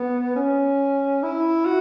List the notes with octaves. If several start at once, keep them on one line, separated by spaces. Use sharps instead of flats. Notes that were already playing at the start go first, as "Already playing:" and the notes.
Already playing: B3
C#4
E4
F#4